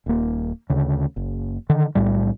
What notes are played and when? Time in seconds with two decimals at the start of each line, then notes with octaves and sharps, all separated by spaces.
0.06 D#1 A#3
0.70 D2 C#3
1.16 F#1
1.70 D3 D#3
1.95 B1 A2 G3